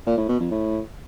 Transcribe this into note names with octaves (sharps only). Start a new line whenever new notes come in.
A#2
A2
B2
F2
A2